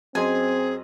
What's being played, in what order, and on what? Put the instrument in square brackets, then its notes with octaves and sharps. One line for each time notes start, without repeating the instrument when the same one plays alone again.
[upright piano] F#2 D#5 C6 [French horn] C4 [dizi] G#4 [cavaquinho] G#5